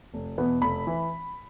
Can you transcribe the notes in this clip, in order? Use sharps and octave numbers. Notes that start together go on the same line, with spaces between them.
F1
E2 B2 B3
F1 B5
E3